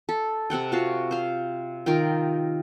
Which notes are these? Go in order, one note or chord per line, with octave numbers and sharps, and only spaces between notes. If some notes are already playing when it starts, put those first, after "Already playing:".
A4
C3 C4 F#5 G5
F4 F#4 F5
C5 F5
D#3 F4 A#4 G5